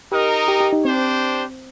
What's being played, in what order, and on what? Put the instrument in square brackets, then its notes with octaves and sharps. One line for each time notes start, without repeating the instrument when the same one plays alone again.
[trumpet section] D#4 A#4 D#5 [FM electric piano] G4
[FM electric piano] G4
G4
D#4
[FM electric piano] C4 [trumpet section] D4 G4 C5